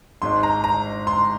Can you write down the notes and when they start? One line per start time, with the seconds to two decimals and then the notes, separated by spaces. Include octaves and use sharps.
0.22 G#1 G#2 G#3 C6
0.43 A#5
0.64 A#5
1.07 C6